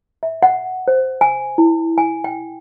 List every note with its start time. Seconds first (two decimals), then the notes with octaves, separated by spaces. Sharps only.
0.23 E5
0.43 F#5
0.88 C5
1.21 G#5
1.58 E4
1.98 G#5
2.24 G5